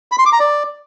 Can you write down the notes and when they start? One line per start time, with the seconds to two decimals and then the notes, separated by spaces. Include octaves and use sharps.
0.12 B5
0.19 C6
0.26 D6
0.33 A#5
0.40 D5